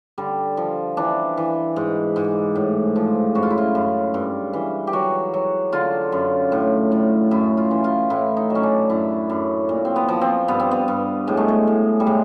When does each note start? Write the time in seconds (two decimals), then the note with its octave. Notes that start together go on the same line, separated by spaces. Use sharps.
0.18 D3 G3
0.57 F3
0.97 E3 D4
1.37 E3
1.76 G#2
2.16 G#2
2.55 A2
2.96 F3
3.35 F#2 F#4
3.43 F4
3.50 E4
3.58 F4
3.75 F#2
4.14 G2
4.53 E3
4.87 G4
4.93 F#3 F#4
5.34 F#3
5.72 D3 F4
6.12 F#2
6.52 A2
6.92 A2
7.31 F#2 E4
7.57 F4
7.71 E3
7.84 F4
8.10 A2 E4
8.37 D#4
8.50 F#3
8.55 C#4
8.63 D4
8.90 F#2 E4
9.30 F#2
9.69 A#2
9.85 C4
9.96 B3
10.08 F3
10.21 C4
10.48 G2 B3
10.60 C4
10.71 B3
10.88 G2
11.27 A2 G#3
11.37 A3
11.48 G#3
11.67 A2
12.00 G3
12.07 A2 G#3